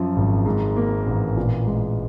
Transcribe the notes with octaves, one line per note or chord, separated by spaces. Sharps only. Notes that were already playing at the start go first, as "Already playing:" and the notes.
Already playing: F#2 F3
G#1
G#2
A#3
A1
A#2
G#3